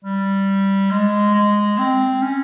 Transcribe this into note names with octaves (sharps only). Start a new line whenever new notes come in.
G3
G#3
G#3
C4
C#4